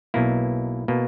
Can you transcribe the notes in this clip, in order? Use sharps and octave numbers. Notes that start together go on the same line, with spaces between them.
B1 B2 A#3 E4
B2 A#3